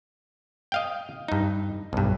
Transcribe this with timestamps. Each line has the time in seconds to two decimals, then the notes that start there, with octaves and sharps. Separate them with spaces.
0.72 D#5 F5 G5
1.28 G2 D#4
1.93 B1 G2